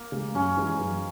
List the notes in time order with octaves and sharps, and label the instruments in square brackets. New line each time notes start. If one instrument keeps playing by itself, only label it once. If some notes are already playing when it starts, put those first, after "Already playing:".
Already playing: [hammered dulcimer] A#3
[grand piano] C#3 G#3 C#4
[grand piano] F#2 [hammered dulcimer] C#4
[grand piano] E3 G#3 D#4 G#4
F#2